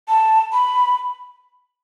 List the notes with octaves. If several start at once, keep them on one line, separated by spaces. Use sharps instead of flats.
A5
B5